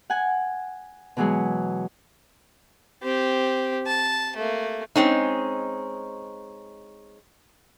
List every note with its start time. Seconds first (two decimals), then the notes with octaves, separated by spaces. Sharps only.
0.10 F#5 G#5
1.17 B2 E3 F#3 G#3 G#4
3.03 C4 G4
3.86 A5
4.36 A3 A#3
4.96 G#3 C4 C#4 D#4